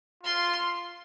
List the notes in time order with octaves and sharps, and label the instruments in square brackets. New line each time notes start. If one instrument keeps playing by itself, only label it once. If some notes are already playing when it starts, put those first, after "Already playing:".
[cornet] F4 [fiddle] C6